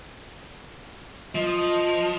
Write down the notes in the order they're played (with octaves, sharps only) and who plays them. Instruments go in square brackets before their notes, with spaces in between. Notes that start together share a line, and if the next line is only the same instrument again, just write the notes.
[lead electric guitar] F3 [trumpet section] D#5